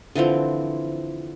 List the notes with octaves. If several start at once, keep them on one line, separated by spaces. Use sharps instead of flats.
D3 E3 F3 C4